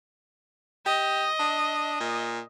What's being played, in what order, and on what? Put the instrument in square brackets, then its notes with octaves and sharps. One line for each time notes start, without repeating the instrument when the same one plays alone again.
[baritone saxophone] G4 [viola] D#5
[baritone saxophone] D4
A#2